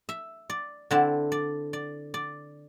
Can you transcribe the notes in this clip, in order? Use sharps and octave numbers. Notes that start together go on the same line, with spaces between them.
E5
D5
D3 C4 E4 D5
D5
D5
D5